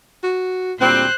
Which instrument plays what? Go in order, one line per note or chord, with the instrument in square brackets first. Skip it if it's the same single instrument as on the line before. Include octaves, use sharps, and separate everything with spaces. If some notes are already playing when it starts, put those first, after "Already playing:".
[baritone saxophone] F#4
[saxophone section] D2 G3 C4 [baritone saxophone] A#2 [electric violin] C5 F#6